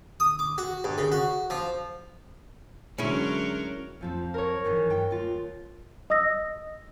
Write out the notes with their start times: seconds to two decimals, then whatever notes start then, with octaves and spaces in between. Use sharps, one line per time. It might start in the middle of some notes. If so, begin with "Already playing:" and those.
0.20 D#6
0.39 D6
0.58 F#4
0.84 G2
0.98 C#3
1.12 F#4
1.50 F3
2.98 D3 F#3 G#3 C#4 E4 A#4 C#5
4.01 F2 F3 C4
4.34 A#4 C#5
4.64 G#2 D#3 E3
4.90 G2 G5
5.11 D#2 F4
6.10 D#5 D#6 E6 A#6